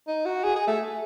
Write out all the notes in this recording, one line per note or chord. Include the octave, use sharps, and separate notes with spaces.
D#4
F#4
G#4
G#4
A3